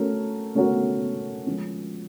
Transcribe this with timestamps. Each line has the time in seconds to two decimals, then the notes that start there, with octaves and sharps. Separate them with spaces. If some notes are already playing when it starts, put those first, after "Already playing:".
Already playing: A3 C#4 F#4 A#4
0.55 A3 C#4 F#4 A#4
1.46 F3 G#3 C#4